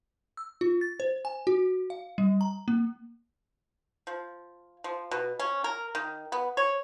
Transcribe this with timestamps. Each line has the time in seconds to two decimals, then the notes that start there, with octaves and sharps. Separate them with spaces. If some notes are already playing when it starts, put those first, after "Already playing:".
0.37 E6
0.61 F4
0.81 A6
1.00 C5
1.25 G#5
1.47 F#4
1.90 F5
2.18 G3
2.41 A#5
2.68 A#3
4.07 F3
4.84 F3
5.11 B2
5.39 C#4
5.64 A#4
5.95 D#3
6.32 B3
6.57 C#5